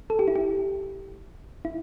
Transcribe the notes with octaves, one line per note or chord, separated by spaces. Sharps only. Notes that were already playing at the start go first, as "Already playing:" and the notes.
A4
G4
E4
G4
E4